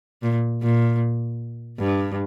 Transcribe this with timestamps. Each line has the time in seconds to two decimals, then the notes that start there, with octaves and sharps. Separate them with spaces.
0.22 A#2
0.62 A#2
1.79 G2